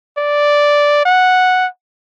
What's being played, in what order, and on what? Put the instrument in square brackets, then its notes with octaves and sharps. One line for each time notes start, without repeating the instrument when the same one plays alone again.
[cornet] D5
F#5